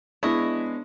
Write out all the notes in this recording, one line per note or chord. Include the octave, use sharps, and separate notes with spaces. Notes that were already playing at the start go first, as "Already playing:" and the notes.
G#3 B3 D4 E4 C#5 D#5